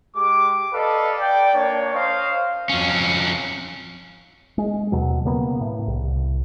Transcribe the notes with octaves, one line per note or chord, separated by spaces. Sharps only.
G#3 G4 D6
A4 B4 D5 D#5 F5
D5 G5
A#3 D4 C#5
C5 D#5 F5
F2 C#4
G#3
D#2 B2 F#3
C#3 G3 A#3 B3
A2
C2